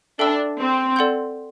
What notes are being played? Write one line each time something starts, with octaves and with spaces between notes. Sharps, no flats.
D4 A4 E5 G5 B5 E6
C4
A4 D5 F#5 C6 G6